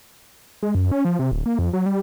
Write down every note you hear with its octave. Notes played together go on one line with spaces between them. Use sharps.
G#3
F#2
C#4
F3
C3
D1
A#3
F2
F#3
G3